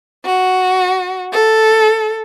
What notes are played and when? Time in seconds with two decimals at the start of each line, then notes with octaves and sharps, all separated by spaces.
0.24 F#4
1.33 A4